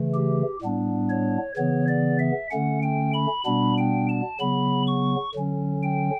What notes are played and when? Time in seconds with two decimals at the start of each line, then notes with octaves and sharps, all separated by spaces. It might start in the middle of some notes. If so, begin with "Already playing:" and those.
Already playing: C#3 E3 A3
0.15 G4
0.62 A2 G3 B3 D4
1.09 C#5
1.56 C#3 E3 B3 C#5
1.88 D5
2.19 E5
2.51 D3 A3 C#4 F#5
2.82 G5
3.14 B5
3.46 B2 G3 B3 D4 B5
3.78 G5
4.09 A5
4.40 C#3 F#3 B3 B5
4.87 C#6
5.35 D3 F#3 C#4
5.83 G5